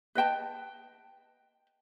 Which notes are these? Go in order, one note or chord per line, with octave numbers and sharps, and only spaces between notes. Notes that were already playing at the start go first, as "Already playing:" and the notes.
B4 D#5 G5 A5